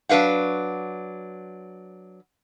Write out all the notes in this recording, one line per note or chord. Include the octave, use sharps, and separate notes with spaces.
F#3 D4 B4 F5 F#5